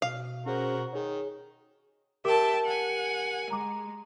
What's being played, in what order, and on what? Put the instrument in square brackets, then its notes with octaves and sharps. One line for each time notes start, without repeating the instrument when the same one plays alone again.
[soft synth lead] B2 [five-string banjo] F5
[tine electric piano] C#4 G#4 C5 [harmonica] F#4 A#4
[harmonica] D#3 [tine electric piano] G#4 C#5
[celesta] G4 A#4 D6 [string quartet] E5 G5 A5
[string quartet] F#5 G#5
[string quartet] G#3 [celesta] A#5 D6